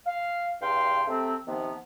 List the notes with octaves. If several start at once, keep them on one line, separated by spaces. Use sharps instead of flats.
F5
E2 G2 F5 G5 C6
C3 A3 C4
C3 D#3 F3 B3